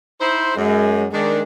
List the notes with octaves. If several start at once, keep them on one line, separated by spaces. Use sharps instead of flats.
D#4 E4 C5
F#2 G#3
D#3 G#3 D4